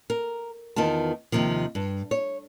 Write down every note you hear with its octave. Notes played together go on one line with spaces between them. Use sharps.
A#4
E2 D#3 B3 F4 A5
D#2 G#2 C3 D#3 F3
G2
C#5